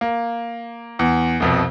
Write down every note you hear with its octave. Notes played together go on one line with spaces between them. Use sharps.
A#3
E2
C2 F2 B2